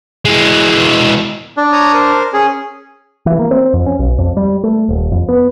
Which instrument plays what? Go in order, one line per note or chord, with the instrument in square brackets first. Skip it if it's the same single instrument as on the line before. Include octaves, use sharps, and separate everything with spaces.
[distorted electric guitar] E3 G#3
[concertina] D4
[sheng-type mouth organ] C#5 A#5 D#6
A#4 C5
[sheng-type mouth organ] C#4 [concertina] G#4
[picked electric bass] E3
A#3
C4
F2
C#4
B1
F2
G3
A3
D#1
F2
B3